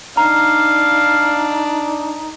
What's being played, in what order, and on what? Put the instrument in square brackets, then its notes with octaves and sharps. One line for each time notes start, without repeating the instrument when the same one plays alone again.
[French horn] D4 [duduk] D#4 [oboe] F5 [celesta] A#5